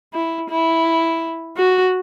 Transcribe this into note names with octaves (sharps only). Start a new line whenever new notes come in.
E4
E4
F#4